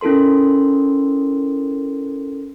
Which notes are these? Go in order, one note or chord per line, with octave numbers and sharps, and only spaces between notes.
C#4 E4 A4 A#4 C6